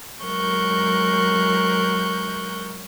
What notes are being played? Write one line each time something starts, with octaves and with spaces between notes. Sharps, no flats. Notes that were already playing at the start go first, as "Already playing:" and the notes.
F#3 G#3 A#4 C#6 F#6 G6